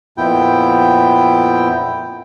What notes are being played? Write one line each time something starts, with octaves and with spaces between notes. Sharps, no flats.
F2 A#2 B3 E4 G5